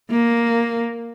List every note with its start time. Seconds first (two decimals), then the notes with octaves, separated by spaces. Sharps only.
0.11 A#3